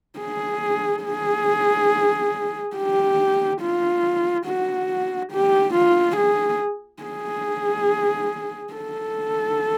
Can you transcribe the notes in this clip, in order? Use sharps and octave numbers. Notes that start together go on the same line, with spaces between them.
G#4
G#4
G4
F4
F#4
G4
F4
G#4
G#4
A4